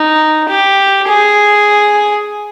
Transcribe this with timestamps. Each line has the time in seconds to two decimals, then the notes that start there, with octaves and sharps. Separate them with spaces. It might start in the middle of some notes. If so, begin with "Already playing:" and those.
Already playing: D#4
0.48 G4
1.08 G#4